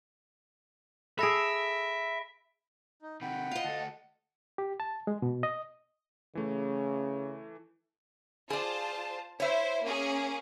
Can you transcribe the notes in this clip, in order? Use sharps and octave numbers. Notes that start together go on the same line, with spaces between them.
G#4 A4 E5 B5 A#6 D7
D#4
C3 D#3 F#5 G5 B5
F4 D#5 F5
D2 A4 A5
G4
A5
G#3
B2
D#5
C#3 E3 A3
F4 G#4 C5 D5 A5
E4 C5 C#5 E5
A#3 C#4 G#4